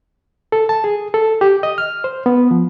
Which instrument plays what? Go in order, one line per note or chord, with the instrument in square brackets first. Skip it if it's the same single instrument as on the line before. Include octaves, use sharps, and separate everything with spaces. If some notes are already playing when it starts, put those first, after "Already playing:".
[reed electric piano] A4
A5
G#4
A4
G4
D#5
F6
C5
B3
F3